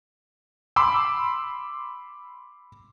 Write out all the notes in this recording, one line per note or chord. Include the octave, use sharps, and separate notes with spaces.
B5 C6 D6 E6